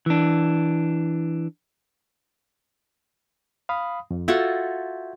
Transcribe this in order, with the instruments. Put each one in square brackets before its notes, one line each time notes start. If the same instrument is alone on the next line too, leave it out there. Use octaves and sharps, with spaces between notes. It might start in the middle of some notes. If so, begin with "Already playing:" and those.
[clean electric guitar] E3 D4
[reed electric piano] F5 B5 D#6
F2
[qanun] F4 F#4 A4 [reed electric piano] E5 G6 G#6